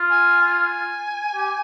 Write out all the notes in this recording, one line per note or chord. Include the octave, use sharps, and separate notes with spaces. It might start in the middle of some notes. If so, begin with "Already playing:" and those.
Already playing: F4
G#5
G#5
G4